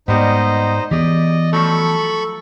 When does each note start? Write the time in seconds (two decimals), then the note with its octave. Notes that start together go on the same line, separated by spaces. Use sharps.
0.08 G#2 G3 A#3 B3 D#4 C5 D#5
0.91 E3 B3 G4 G#4 D5 D#5
1.53 F3 F#3 A3 A4 B5 C#6